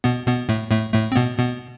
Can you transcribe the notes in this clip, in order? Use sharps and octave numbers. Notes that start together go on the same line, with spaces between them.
B2 B3
B2 B3
A2 A3
A2 A3
A2 A3
C4
B2 B3
B2 B3